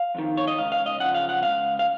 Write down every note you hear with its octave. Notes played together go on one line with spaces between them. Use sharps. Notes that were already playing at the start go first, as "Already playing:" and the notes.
Already playing: F5
F2 D#3
C#5
D#5
C#2 C#3 F5
F5
D#5
F#2 C#3 F3 F#5
F5
F#5
C#2 B2 F5
F5